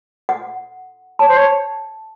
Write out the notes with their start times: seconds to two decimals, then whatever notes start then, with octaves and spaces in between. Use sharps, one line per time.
0.29 F#5
1.19 C#5 A5
1.27 C5
1.36 C#5